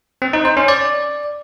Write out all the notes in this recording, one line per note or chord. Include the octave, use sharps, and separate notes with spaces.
C4
D#4
C5
C#4
D5